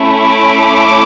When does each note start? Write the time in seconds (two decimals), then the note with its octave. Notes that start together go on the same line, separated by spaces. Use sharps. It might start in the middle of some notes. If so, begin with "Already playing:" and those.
Already playing: A3 C#4 E4
0.23 D6